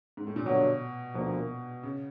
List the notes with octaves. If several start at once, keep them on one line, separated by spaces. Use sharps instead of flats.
G#2
A2
A#2
G2 B2 D3 F#3
D2 B2 D3 F3 A#3
C#3